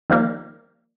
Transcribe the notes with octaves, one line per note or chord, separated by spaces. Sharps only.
D#3 F3 G3 A#3